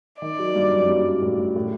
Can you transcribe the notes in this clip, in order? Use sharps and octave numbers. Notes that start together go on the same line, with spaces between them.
D#3 D5
F#3
G2
F#2
G2
A2
A2